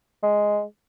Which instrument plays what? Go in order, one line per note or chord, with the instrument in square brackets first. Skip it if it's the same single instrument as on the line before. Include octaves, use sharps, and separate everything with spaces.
[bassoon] G#3